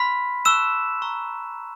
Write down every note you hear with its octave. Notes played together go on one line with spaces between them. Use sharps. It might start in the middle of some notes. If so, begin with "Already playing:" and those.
Already playing: B5 C6 F6 B6
A5 C#6 E6 F#6 E7
A#5 C#6 E6